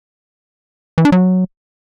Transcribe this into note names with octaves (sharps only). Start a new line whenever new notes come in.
E3
D4
F#3